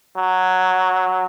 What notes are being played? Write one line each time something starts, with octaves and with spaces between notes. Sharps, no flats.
F#3